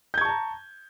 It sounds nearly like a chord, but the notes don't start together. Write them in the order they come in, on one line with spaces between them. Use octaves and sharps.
G6 G#6 C#6 A5 A#5